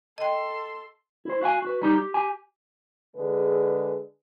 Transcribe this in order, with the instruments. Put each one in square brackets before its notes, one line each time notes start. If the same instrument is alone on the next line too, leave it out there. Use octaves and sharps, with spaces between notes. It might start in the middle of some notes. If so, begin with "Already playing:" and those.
[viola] A4 C6 [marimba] D#5 G5
[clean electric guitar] E4 C5
F#4 F5 F#5 G#5
F#4 B4
G3 D#4 G4
G4
G4 G#5
[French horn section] D3 G#3 G#4 B4